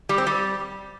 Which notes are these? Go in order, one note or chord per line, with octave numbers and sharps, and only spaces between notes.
G3
C4
G3